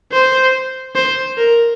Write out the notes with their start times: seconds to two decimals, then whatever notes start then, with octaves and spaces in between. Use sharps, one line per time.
0.12 C5
0.95 C5
1.37 A#4